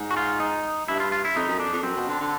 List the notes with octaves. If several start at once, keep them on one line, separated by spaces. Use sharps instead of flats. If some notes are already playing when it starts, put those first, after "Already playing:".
Already playing: G#2
F#4
F4
D#4
G2 E4
F4
F4
E4
F2 D#4
F#2
F2 D4
F2
F#2 C4
B2
D3
D3